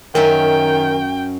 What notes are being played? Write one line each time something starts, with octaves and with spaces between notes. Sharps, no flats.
F#2 D#3 C#4 A#4 E5 G5